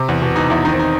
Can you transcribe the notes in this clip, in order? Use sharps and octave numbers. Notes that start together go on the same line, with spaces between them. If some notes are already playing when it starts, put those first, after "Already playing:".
Already playing: C3
E2
B2
B2 D#4
E2 E4
D#3 D#4
C4
D#4